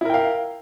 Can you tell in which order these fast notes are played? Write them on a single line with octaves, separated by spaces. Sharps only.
E4 A#4 G5 F5